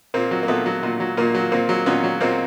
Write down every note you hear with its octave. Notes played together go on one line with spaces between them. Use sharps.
A#2 A#3 C4
F#3
A#3
A#2 A3 B3
F#3
A#2
F#3
A#2 A#3
F#3
A#2 A#3 C4
F#3
A#2 B3 C#4
F#3
A#2 A#3 C4